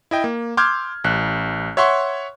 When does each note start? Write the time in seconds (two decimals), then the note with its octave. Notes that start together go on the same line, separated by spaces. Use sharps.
0.11 E4 D#5 G5
0.24 A#3
0.57 C6 D6 E6 F6 G6 G#6
1.04 A1 F#6
1.77 C#5 E5 F#5 C6 C#6